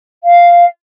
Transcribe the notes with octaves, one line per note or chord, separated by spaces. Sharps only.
F5